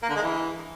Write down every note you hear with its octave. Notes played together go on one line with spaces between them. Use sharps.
A#3
D3
G#3
E3